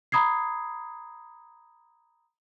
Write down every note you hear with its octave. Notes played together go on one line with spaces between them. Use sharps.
A#5 B5 D#6 G#6 C7